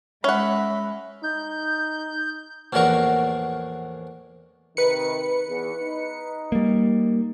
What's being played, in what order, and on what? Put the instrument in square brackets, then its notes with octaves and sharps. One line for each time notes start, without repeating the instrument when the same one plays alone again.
[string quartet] G#3 B5 [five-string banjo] C#4 F#5 [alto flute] E5
[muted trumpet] D#4 [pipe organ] G6
[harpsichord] A#1 E2 A2 F#4 A#4 C#6
[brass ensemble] C3 D#3 [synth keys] B4 C#7
[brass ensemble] E2
D#4
[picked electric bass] G3 A#3